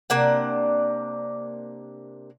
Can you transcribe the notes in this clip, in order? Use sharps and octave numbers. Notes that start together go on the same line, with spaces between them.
C3 A#3 D4 F#5